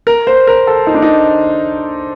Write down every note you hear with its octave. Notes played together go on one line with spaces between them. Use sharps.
A#4
C5
A#4
A4
D#4
D4
D#4